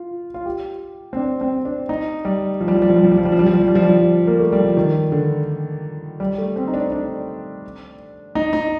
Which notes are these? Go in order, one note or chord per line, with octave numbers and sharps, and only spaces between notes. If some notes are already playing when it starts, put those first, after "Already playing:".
Already playing: F4
F4
G4
C4
D4
C4
D4
D#4
G3
F3
G3
F3
G3
F3
G3
F3
G3
F3
G3
F3
G3
F3
G3
F3
G3
F3
G3
F3
A#3
A3
G3
F3
D#3
D3
G3
A3
C4
D#4
D4
D4
D#4
D#4